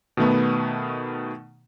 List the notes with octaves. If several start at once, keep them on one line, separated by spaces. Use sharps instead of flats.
B2 D#3 A3 B3